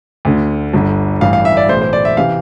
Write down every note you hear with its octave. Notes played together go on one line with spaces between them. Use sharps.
D2 D3
G1 G2 D3
A1 G2 E3 F5
F5
E5
D5
B1 A2 E3 C5
C5
D5
E5
C3 E3 F5